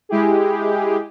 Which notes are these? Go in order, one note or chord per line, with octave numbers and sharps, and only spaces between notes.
G#3 E4 G4 G#4